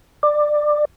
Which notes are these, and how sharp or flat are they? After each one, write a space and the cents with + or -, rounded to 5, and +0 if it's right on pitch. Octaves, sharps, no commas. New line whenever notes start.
D5 +20